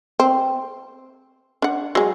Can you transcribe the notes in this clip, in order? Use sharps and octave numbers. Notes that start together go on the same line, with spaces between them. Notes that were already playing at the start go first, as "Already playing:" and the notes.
C4
D4 F#5
F#3 G#3